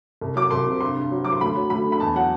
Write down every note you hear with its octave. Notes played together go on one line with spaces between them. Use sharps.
C2
F#3 D6
C2 C6
C3
G2 C6
G2
F#3
F#3 D6
C6
D2 B5
F#3
D2 B5
D3
B5
E2 A5
F#3 F#5